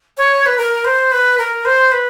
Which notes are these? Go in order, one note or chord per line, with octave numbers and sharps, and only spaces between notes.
C#5
B4
A#4
C5
B4
A#4
C5
B4